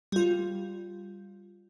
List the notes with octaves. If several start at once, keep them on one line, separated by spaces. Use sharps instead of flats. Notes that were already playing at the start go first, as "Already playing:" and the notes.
G3 F4